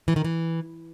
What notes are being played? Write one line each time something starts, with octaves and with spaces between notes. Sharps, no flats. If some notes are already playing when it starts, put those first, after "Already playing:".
E3
D#3
E3